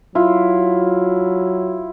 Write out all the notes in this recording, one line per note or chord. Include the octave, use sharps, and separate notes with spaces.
F#3 E4 F4